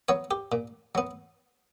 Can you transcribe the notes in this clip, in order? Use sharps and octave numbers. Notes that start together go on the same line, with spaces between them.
F#3 B3 C#5
G4
A#2
F#3 B3